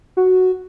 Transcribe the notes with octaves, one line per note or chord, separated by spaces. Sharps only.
F#4